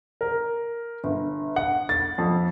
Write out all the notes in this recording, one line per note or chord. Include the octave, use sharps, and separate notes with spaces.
A#4
G1
F#5
A6
F2